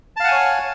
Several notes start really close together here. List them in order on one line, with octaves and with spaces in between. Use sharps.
A5 F5 F#5 G#5 C#5